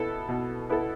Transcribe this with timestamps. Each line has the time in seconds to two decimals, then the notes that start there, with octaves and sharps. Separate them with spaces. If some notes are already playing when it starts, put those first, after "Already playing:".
Already playing: B2 B3 E4 A4
0.29 B2
0.69 B3 E4 A4